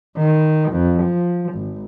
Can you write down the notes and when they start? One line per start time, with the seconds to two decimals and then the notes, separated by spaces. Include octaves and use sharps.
0.17 D#3
0.72 F2
1.03 F3
1.53 G#1